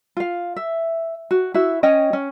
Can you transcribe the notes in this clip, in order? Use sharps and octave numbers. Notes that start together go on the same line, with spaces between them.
F4 F5
E5
F#4
E4 F#4 E5
C#4 C#5 D#5 G5
C#4